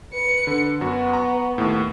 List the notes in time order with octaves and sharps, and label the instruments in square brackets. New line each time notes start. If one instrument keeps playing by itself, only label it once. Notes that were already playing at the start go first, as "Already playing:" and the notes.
[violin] B4 C#7
[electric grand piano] D3
[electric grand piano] F#2 F#4 [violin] B3
[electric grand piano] A#5 C#6
D#2 A2